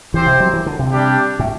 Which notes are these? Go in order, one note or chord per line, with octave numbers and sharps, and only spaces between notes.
E3 C4 G4 C5
C3
F#3
E3
D3
C3
G3 D4 G4
A2